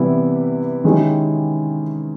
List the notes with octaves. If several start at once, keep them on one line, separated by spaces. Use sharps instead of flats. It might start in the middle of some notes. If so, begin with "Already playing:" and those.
Already playing: C3 E3 G3 B3 E4
D#3 G#3 C#4 E4 G4